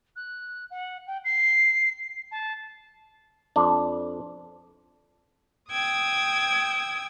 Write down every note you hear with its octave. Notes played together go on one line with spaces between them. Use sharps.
F#6
F#5
G5
C7
A5
F2 D4
G5 D#6 E6 G#6